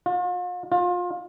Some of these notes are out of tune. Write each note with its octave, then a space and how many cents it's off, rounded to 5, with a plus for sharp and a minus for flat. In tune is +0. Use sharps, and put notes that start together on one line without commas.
F4 +40
F4 +25